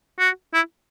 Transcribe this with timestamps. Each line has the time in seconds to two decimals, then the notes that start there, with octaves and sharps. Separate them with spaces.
0.19 F#4
0.54 E4